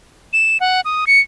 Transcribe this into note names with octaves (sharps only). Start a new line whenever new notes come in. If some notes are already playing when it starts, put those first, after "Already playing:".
E7
F#5
D#6
C#7